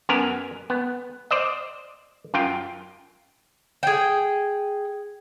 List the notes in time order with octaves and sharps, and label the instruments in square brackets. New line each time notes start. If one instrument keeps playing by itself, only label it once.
[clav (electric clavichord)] F#2 B3 A#4 G#5
B3
C5 D5 D#5
F#2 F4 G5
[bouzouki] G#4 G5